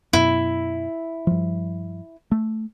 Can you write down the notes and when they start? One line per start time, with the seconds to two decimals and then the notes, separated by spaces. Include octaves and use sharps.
0.13 F#2 B2 E4
1.27 G2 F3
2.31 A3